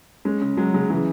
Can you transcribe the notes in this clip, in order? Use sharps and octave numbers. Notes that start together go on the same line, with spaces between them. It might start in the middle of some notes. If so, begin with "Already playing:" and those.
G#3 C#4
C#3
F#3 G#3
C#3 G#3
C#3 E3